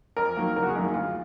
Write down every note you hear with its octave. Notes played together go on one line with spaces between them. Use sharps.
F2 A#4
D#3 F#3 A#3
F#1 A#4
F#4
G#4
F#2 D#3 F#3 A#3
D2 F4